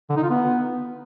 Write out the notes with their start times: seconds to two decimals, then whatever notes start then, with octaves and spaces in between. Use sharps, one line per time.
0.10 D3
0.16 D#4
0.23 F4
0.30 B3